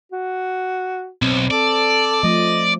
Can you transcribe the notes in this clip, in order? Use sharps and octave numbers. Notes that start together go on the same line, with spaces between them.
F#4
B1 C4
A4 D5
F3 A3 D#5